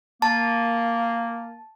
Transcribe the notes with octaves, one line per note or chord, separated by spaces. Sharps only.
A#3 A5